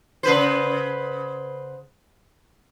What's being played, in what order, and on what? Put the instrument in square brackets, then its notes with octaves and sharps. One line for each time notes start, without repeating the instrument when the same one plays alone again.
[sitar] C#3 B4 C5